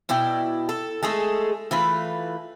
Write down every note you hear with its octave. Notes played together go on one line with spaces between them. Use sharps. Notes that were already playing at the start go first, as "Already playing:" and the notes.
B2 E4 D5 G5
A4
G#3 A3 G#4 A4
E3 A3 F4 B4